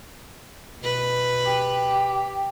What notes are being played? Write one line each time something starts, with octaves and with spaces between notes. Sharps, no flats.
B2 B4
G4